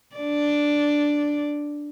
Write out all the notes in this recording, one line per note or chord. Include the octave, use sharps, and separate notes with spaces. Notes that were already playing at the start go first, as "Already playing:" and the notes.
D4 D5